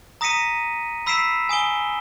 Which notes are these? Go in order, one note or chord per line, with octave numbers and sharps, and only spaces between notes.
A#5 D#6 A#6 B6 C#7 D#7
B5 E6 B6 C7 D7 E7
G#5 D#6 D7 G7